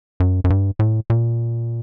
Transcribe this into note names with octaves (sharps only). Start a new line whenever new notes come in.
F#2
F#2
G2
A2
A#2